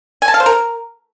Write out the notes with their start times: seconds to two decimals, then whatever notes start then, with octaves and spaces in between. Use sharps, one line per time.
0.22 G#5
0.28 A5
0.34 F5
0.40 C5
0.46 A#4